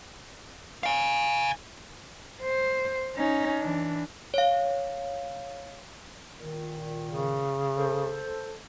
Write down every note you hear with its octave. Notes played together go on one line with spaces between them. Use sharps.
F5 G#5
C5
C#4 D#4
E3 D4
C#5 F5
A#2 D#3
C#3
A4 C5